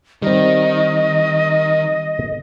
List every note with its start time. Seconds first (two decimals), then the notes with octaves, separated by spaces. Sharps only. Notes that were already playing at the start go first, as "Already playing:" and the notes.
0.22 D#3 G3 C4 D#5